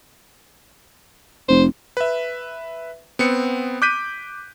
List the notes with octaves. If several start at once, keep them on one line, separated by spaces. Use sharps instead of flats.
F1 C5
B4 E5
B3 C4 C#7
D6 F#6 G6 B6 D7 D#7